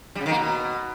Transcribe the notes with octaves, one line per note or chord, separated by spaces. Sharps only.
G3
C#3
D#3
A#3
B2